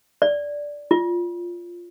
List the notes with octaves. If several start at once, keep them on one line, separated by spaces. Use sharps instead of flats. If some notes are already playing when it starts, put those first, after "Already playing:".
D5
F4